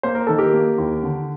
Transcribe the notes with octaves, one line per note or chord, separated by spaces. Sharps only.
A#3 C5
A#4
D#3 A4
G4 A#4
A#3
D#2
D3